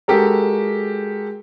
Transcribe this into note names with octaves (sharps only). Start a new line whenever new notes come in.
G#3 F#4 G4 A4 A#4